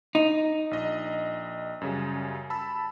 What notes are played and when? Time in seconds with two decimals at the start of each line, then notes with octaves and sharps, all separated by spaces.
0.15 D#4
0.71 A#1 D#5
1.81 F#2 C#3 G3
2.50 A5 B5 E6